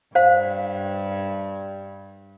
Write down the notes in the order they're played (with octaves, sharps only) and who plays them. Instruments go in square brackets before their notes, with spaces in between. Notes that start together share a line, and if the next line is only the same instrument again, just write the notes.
[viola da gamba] G2 [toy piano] C5 F5